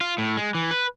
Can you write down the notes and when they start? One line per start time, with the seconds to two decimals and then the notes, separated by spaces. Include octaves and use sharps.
0.01 F4
0.18 A2
0.37 G#3
0.55 E3
0.71 B4